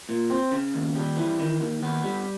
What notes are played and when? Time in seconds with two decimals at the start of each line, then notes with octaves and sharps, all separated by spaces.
0.09 A#2
0.30 C4
0.51 C#3
0.74 D#2
0.95 G3
1.17 E3
1.39 D#3
1.60 D#2
1.83 B3
2.04 G3